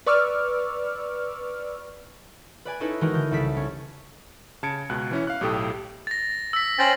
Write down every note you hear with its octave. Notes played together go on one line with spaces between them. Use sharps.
B4 D5 C#6 D6 E6 F6
B4 D5 G#5
C#4 D#4 E4 A4 B4
D#3 E3 G#3 D#4 F#4 A#4
D3 G6
C2 C#3 A4 D5 B6
C#4
C#3 A5 G#6 C#7 D7
C#2 B2 F#6
E3 C#4 E4
F5 F#6
B1 A2 G4 A4 D#6
A6 A#6
E6 B6
C#4 C5 G5 A6 A#6 F#7